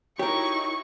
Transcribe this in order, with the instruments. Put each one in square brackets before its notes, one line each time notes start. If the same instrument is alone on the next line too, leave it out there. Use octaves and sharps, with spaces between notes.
[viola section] D#4 E4 F#4 [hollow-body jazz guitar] G4 A#4 [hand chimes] C#5 [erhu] C#6